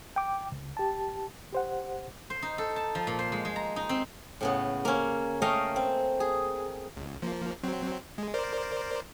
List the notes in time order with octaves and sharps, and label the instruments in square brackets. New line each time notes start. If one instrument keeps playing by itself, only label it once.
[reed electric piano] G5 D6
C#2
G4 A5
G4 C5 F#5
[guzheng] C5
D#4
A4
A5
F3
A#2
C5
G#3
G#3
A#5
D#4
C4
A2 C#3 B3
A#3 C#4
A3 A#3 C#4 D#5 F5 G5
C4
G#4
[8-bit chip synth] C#2
F3 A#3
F#3 C4
G#3
A#4 C5 D5